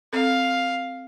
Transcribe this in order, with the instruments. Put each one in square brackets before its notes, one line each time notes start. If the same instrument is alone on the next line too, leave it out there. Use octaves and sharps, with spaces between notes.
[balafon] C4 A4 [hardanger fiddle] F5